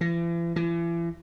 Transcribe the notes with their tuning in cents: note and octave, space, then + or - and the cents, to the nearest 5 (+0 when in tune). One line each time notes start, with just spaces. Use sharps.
E3 +45
E3 +40